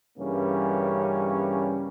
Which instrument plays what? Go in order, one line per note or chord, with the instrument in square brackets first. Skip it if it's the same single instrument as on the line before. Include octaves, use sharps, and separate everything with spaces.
[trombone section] G2 C#3 E3 G3 A#3 C#4